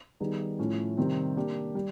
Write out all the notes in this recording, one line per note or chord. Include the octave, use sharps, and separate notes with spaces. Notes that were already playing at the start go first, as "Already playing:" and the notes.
D#3 G3 B3 D#4 G#4
A2 F3 A3 C#4
C3 D#3 G3 C4
A#3 D4 G4
G3